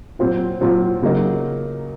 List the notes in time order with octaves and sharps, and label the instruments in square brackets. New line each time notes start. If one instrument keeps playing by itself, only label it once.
[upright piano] A#2 F#3 C4 F4
A#2 F#3 C4 F4
C#3 F#3 A#3 D#4